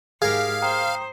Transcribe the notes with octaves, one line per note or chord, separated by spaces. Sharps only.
G#2 G4 G#4 A#4 F5 D#6
C5 G5 A#5 D#6